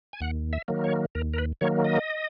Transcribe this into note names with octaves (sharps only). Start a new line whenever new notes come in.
G#5
D#2 F#5
E5
D#3 F#3 A#3
C#5
D#2 A#4
A#4
B4
D#3 F#3 A#3 C#5
D#5